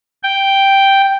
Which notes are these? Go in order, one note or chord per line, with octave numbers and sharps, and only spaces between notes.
G5